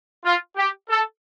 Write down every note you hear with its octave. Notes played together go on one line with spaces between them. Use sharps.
F4
G4
A4